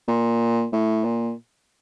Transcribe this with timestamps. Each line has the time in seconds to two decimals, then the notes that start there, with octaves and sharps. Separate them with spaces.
0.08 A#2
0.73 A2
1.04 A#2